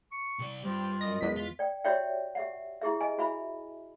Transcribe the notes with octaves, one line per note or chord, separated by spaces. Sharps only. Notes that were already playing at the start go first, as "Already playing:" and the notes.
C#6
C3 D5
G2 C4 F4 G4
F#2 D#5 A#6
E2 G#3 B6
F4
D5 G5
F#4 G4 C#5 D5 E5 G5
G4 E5 F#5
E4 G4 G#4 E5
D#5 G#5
E4 F#4 E5 B5